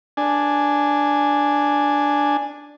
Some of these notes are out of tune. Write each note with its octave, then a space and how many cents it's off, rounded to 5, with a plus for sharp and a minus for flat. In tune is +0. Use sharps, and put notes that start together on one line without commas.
D4 +0 G#5 +0